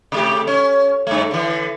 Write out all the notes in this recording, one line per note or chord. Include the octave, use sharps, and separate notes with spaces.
C3 A3 G4
C#4
G2 A3
D3 E3